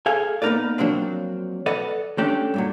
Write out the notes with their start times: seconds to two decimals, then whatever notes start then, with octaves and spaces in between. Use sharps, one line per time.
0.06 G#4 A4 F5 G#5
0.42 A#3 B3 D#4 A#4 B4 D5
0.78 F3 F#3 A#3 C4 D4
1.66 A4 B4 D5 D#5 F#5
2.18 A3 C#4 D4 G4
2.54 G2 A#2 F#3